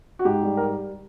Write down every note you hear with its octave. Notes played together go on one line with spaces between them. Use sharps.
F#4
G#2 G4
G3
A#4